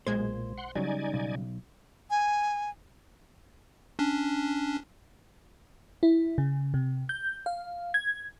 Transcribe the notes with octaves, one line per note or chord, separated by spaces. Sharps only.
B1 A#2 G#3 C5 G#6
F#5 C6
C#3 F#3 G3 D#4 D5 G#5
B1
G#5
C#4 D4
E4
C#3
C3
G6
F5
G#6